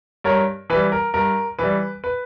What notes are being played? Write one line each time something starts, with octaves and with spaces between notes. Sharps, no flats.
G2 A#4 C#5
E3 G3 B4
A#4
G2 A#4
E3 G3 B4
B4